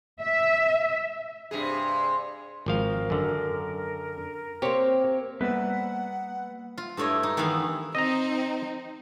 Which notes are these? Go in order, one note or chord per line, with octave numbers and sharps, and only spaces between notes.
E5
G2 C3 G#4
G#1 F3 A#4 F5
F#2 D3
A#3 C4 G4 C#5
G3 A#3 B3 B4 E5 F#5
F4
G2 A3 E4 C#5 D#5
D#4
D#3 E3 B3 E5 F5
C4 D#4 D#5 A#5